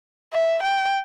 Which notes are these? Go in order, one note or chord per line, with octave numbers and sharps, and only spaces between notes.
E5
G5